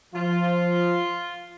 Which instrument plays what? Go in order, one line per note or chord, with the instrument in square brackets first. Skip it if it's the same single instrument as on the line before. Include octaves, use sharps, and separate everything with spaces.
[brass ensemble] F3 [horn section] F4